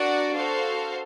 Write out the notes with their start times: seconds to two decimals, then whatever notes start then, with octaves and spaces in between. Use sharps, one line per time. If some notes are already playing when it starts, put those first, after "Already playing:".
Already playing: D4 F#4 A#4 D5 F#5
0.35 F#4 A4 C5 F5